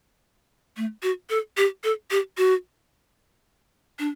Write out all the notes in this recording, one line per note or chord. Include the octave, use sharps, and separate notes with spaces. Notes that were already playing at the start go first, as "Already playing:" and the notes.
A3
F#4
A4
G4
A4
G4
F#4
D4